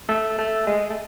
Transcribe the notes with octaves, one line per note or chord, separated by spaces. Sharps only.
A3
A3
G#3
A3